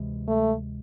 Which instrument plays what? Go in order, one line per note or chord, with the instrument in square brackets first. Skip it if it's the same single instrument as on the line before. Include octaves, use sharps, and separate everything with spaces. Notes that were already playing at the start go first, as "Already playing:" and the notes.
Already playing: [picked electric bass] D2 C3 E3 G#3
[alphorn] A3